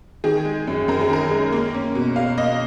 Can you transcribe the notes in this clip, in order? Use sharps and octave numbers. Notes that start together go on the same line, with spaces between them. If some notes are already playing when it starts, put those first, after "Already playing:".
D#3 G#4
G#3
F#2
F#2 A#4
G#4
D#3 A#4
G#3
A#3
C#4
B2
B2 F5
A#3 D#5